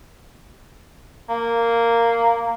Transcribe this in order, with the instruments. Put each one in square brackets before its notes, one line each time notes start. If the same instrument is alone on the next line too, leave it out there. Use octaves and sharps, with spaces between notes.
[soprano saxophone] A#3